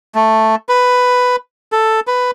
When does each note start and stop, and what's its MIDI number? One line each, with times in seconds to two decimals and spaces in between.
0.15 0.55 57
0.69 1.36 71
1.72 2.00 69
2.07 2.31 71